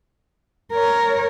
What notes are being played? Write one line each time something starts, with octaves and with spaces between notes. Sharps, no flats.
A#4 C#5